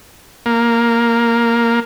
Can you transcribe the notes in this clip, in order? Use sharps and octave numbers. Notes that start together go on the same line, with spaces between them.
A#3